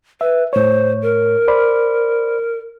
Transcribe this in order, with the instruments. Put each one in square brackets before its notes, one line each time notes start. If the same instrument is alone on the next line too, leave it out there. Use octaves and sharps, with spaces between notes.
[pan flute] B4 [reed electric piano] E5
[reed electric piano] A2 C#5 [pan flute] C5
[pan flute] A#4
[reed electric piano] C5 D5 B5